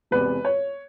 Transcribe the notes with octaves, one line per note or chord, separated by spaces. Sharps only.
E1 E2 C3 B4
C#5